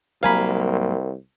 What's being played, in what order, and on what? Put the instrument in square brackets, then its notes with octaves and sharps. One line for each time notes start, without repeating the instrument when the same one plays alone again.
[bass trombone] C2 [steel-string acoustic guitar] G#2 F#3 A#3 [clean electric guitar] A#4 [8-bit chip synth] F5 G#5 B5